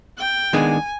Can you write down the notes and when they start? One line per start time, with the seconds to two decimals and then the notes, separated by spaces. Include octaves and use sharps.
0.19 G5
0.53 D#3 G#3 B3 D4 G#4 G#5